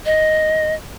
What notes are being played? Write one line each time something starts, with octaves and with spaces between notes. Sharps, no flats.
D#5